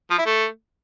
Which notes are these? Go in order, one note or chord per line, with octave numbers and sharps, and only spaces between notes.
F3
E4
A3